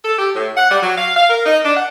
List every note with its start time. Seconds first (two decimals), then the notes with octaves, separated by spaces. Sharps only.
0.05 A4
0.19 G4
0.35 A2
0.57 F#5
0.71 G3
0.83 F#3
0.98 F5
1.17 F5
1.30 A#4
1.46 D#4
1.64 D4
1.77 F#5